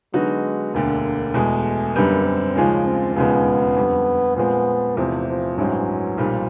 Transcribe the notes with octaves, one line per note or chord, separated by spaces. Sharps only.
D3 F#3 G#3 B3 D#4 F#4
E1 D2 D3 A#3
E2 B2 G#3 A3
F#2 D3 G3 A#3 B3
C4
D#2 C#3 F3 G#3 C#4
C4
E1 D#2 C#3 F3 G#3 B3
F2 D3 G3
A#2 F3 G#3 B3 C4
E2 C3 E3 F3 A3 C4
F3
A1 G2 E3 F#3 G#3 C4
B1 A#2 F3 G3